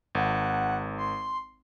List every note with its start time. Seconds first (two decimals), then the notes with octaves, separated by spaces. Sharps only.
0.15 G#1 F#5
0.98 C6